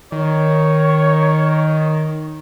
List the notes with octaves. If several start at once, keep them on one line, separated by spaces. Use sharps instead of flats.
D#3 C#5